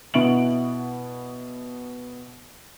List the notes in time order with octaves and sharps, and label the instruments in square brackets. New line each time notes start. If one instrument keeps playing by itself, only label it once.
[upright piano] B2 B3 E4 C#6 D7 F#7